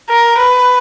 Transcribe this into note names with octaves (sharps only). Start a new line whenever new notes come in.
A#4
B4